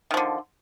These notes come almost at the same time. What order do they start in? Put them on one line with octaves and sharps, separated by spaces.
D#3 F3 D3